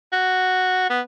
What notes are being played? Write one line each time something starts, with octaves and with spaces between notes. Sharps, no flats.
F#4
B3